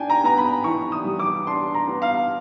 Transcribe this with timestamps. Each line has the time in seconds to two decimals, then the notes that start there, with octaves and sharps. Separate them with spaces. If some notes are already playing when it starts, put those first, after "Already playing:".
Already playing: D4 G5 G#5
0.10 A#5
0.24 B3 A#5
0.38 B5
0.64 E3 C#6
0.92 D#6
1.05 G3
1.19 D6
1.47 D4 C6
1.74 A#5
1.88 B3
2.02 F5